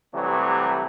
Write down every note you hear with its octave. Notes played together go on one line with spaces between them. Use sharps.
C3 E3 F#3 G3 A3